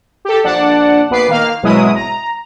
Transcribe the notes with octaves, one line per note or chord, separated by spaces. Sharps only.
G4 A4
A#1 D4 D5 F#5 A5
A#1 B3 B4 D6 C7
D#3 A#3 F5 F6
G#1 B2 F#3 G#3 E4 D#6
A#5